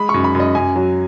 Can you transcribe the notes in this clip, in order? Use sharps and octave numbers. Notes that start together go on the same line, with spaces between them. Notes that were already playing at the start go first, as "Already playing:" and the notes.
Already playing: G#3 B5
F#2 C#6
B5
F#2
D#5
F#2 G#5
F#3